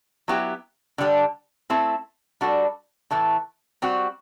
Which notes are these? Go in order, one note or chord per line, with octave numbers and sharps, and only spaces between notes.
F#3 B3 E4 G4
D3 G3 D4 A4
A3 C4 E4 A4
G3 D4 F#4 A4
A2 E3 A3
G3 C4 F#4